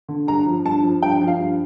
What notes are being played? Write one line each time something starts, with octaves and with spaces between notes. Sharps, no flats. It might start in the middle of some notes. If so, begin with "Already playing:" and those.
D3
G2 A#5
F3
G2 A5
F3
G2 G5
F3
F5
G2